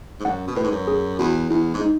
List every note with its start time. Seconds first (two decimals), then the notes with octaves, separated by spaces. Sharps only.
0.20 G#2
0.25 F#2 F#5
0.47 B2
0.55 A2 B4
0.64 G#2
0.72 F#2
0.88 G#4
1.19 E2 F#4
1.50 E2 E4
1.74 G#2
1.81 D#4